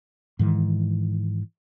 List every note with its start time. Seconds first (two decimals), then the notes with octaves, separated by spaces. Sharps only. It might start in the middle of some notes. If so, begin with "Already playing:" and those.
0.39 G#2 D#3 E3